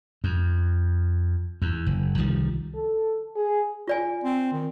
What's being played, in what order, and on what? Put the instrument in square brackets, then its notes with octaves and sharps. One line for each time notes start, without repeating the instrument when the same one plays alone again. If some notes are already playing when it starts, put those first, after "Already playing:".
[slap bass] F2
E2
F#1
C2 D#3 F3 G3
[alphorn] A4
G#4
[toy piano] F4 D5 G#5
[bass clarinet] C4
D#3